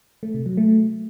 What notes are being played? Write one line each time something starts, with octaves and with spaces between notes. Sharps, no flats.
A3
C3
F#3
A3